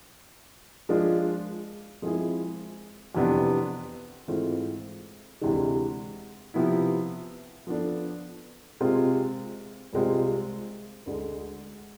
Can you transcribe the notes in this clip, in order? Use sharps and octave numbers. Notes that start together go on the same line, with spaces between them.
F3 G#3 D4 F4
F3 G#3 C4 E4 G#4
F2 C3 E3 B3 D4
G#2 E3 A3 C4 F4
D2 C3 E3 G#3 D4
C3 F3 B3 E4
F3 B3 D4 A4
C3 G#3 C4 F4
C2 C3 G#3 C4 F4
D2 D3 G#3